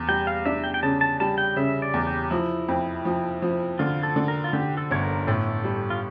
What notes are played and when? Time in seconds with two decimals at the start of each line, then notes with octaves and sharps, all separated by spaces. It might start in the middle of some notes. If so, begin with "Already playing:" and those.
Already playing: E2
0.08 G3 G5
0.27 F5
0.45 D4 E5
0.64 G5
0.74 G5
0.83 C#3 A5
1.01 A5
1.20 G3 A5
1.38 G5
1.56 C#3 E5
1.82 D5
1.94 E2
2.07 G4
2.31 F3 E4
2.68 F2
3.05 F3
3.42 F3
3.79 D3 F4
4.03 A4
4.16 D3
4.28 A#4
4.44 F4
4.53 D3 G4
4.77 A4
4.91 G1 C#5
5.03 A#4
5.27 A2 A4
5.64 G3
5.90 F4